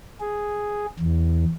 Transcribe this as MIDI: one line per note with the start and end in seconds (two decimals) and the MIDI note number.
0.20 0.86 68
1.00 1.44 40